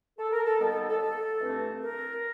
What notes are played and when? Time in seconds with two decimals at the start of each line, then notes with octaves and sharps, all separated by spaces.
0.19 A4
0.32 A#4
0.46 A4
0.59 D#2 D#3 G3 B3 A4
0.69 A4
0.89 A4
1.00 A4
1.40 G2 E3 A3 C4
1.81 A#4